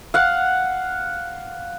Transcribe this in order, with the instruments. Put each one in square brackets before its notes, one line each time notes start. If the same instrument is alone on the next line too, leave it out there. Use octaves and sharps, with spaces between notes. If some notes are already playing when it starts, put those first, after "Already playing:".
[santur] F5 F#5